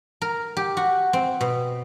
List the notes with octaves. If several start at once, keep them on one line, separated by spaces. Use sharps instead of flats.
A#4
G4
F#4
C4
B2